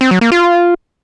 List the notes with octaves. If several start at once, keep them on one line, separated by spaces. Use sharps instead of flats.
C4
F#3
A#3
F4